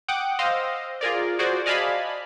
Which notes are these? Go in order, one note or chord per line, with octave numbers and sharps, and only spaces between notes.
F#5 G5 D6 D#6
C5 D#5 F5 E6
F4 G#4 A#4 D5
F#4 G#4 C5 D5
D5 D#5 F5 G#5 A5 B5